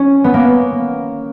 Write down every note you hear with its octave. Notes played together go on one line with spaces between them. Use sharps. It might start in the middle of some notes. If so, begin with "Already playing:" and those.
Already playing: C#4
B3
A#3